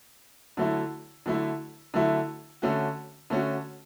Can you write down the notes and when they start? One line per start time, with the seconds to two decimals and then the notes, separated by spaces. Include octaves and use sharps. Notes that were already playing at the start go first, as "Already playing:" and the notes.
0.57 D3 F#3 A3 E4
1.26 D3 F#3 A3 E4
1.94 D3 F#3 A3 E4
2.62 D3 A3 C#4 F#4
3.30 D3 A3 C#4 F#4